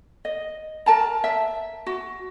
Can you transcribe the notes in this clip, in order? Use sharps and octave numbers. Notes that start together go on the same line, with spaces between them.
D#5
A#4 A5 A#5
E5
F#4